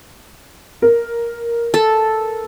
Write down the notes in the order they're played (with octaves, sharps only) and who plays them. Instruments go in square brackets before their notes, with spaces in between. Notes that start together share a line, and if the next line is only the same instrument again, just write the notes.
[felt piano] A#4
[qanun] A4